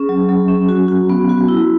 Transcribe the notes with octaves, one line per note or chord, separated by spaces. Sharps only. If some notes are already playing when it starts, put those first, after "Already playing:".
Already playing: C#4 G#4
F#3
F#3
C#4
F#4
F#4
B3
F#4
E4